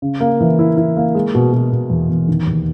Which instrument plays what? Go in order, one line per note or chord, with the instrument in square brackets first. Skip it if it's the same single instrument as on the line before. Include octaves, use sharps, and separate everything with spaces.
[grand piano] C#3
A#3
E3
E4
E4
A#3
G#3
B2
B2
B2
E2
E2
D#3
D#2